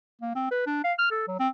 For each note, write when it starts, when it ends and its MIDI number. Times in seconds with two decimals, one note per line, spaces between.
0.22 0.33 58
0.36 0.48 60
0.51 0.63 71
0.67 0.81 62
0.84 0.93 77
0.99 1.08 89
1.11 1.27 69
1.28 1.35 54
1.40 1.49 60